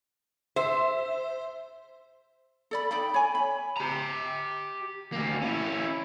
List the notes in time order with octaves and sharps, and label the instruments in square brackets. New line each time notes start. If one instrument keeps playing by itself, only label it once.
[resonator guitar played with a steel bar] C5 [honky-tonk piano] E5
[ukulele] A4 D5 B5
D#4 D5 G5 B5
C#5 G#5
B5
[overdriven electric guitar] G4 A#5
D2 A#3
C#4 E4